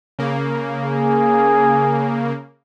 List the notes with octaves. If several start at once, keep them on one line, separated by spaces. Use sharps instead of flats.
C#3 A#3
G#4